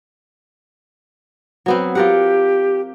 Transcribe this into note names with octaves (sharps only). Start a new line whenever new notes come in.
F#3 B3 C4
F4 G4 A#4 F#5